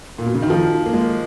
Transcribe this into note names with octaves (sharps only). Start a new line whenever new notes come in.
A#2
B2
C#3
D#3
F3
A#3
G#3